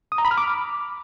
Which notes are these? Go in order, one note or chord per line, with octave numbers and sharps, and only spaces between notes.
D#6
A#5
B5
F6
D6